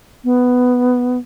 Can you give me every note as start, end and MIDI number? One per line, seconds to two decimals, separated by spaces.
0.24 1.18 59